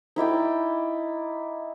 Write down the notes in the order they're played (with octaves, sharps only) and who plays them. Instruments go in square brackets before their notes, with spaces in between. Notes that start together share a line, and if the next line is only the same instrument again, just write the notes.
[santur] D#4 E4 D5 G5